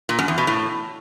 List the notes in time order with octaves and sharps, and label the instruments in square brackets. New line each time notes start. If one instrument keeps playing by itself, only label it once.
[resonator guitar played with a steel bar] A#2
F#2
E2
B2
A2